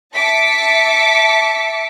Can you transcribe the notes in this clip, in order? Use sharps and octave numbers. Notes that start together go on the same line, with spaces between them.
E5 A5 D6 B6 C#7